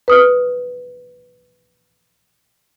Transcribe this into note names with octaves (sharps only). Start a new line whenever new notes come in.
B4 D#6 F6